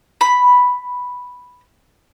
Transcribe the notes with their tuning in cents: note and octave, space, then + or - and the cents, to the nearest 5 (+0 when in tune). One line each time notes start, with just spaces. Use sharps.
B5 +0